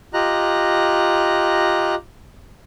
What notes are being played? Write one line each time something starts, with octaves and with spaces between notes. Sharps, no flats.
F4 G4 D#5 A#5 F#6